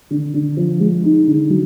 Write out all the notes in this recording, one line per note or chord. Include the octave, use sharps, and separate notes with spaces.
D3
D3
F3
G#3
D#4
D3
F#3